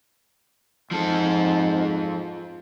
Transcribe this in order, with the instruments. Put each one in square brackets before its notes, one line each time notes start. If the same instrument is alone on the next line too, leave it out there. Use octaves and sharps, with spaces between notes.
[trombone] G#2 [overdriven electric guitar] F3 A4